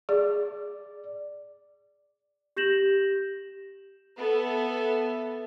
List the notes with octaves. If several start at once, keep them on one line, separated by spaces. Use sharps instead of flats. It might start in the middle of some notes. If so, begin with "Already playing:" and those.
G#4 D5
G4 G6 A#6 E7 F#7
B3 A4 E5